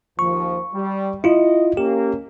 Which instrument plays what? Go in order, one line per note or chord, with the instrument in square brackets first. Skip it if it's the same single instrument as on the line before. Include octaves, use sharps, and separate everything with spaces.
[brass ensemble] D#2 F3 [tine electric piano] C#6
[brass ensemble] G3
[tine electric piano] E4 F4 [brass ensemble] D#5
[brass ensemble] A#3 C#4 [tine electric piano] G4